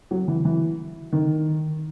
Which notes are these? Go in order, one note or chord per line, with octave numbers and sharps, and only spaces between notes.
F#3
E3
E3
D#3